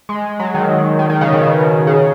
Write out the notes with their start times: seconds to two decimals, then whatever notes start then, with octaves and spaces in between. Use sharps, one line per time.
0.09 G#3
0.40 F#3
0.54 D#3
0.99 D#3
1.10 D#3
1.21 C#3
1.32 B2
1.43 B2
1.87 C#3